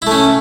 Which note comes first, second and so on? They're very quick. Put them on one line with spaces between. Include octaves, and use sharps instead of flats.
E4 A3 C#4